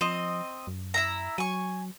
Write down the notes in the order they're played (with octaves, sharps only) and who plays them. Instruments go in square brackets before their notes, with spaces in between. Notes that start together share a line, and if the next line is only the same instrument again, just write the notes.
[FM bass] F3 [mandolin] C4 D#5
[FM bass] F#2
[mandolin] E4 E5 A#5
[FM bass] F#3 [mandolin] G#5 C#6